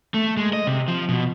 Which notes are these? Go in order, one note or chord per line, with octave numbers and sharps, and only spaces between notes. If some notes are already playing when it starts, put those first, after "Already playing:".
A3
G#3
D#5
C3
F3
B2